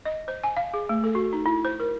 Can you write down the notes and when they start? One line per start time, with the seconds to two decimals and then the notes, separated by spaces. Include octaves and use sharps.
0.05 D#5
0.28 C5
0.44 G#5
0.57 F5
0.74 G#4
0.89 A3
1.04 A4
1.15 F#4
1.33 D#4
1.46 E4
1.65 C5
1.80 A#4